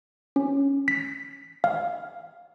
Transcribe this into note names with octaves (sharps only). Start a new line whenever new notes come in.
C#4
B6
F5